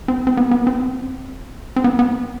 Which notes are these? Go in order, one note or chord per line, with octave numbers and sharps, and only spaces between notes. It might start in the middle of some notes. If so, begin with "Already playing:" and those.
C4
C4
B3
B3
C4
C4
B3
B3